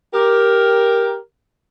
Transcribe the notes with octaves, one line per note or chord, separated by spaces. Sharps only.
G4 A#4